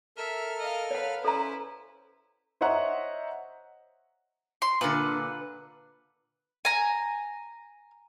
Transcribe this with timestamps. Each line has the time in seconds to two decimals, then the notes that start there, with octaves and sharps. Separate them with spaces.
0.17 A4 A#4 E5 F6
0.59 D#5 F5
0.91 B4 C#5 F5 F#5
1.25 C#4 E4 A4 B4 C5 E5 A#5
2.61 C5 C#5 D#5 E5 F#5 A#5
4.62 C6
4.81 A#2 D3 B4
6.65 G#5 A#5